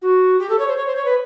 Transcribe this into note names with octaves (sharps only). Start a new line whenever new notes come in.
F#4
G4
A4
C#5
C5
C#5
C5
C#5
B4